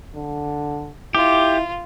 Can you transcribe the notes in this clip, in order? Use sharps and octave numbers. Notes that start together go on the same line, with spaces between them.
D3
E4 F4 G4